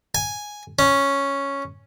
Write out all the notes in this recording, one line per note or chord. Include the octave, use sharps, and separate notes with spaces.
G#5
C#4